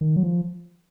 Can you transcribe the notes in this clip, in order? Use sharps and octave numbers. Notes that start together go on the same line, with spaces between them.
D#3
F#3
F3